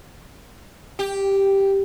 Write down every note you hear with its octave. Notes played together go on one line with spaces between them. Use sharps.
G4